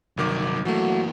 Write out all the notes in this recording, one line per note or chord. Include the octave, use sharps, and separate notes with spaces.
G1 C2 D#3 F#3 D6
E3 F#3 A3 A#3 F#4